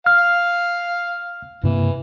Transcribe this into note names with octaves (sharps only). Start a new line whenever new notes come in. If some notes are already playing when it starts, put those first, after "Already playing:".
F5 F6
G2 C3 E3 A#3